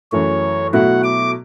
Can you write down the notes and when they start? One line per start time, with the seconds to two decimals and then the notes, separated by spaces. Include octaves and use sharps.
0.12 F#2 E3 A3 C#5
0.73 B2 F#3 A3 E4 F#5
1.04 D6